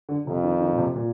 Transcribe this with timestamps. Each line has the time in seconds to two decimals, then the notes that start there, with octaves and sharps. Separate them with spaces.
0.09 D3
0.27 F2 C3
0.44 D#3
0.61 D#3
0.72 A#2
0.78 C3
0.95 A#2